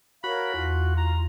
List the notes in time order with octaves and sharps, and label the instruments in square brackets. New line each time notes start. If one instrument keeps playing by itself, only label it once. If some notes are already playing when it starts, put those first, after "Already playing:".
[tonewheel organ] F#4 [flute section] A#4 C#5 F5 [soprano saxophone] B5
[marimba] E2 [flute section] F4
[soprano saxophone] A#5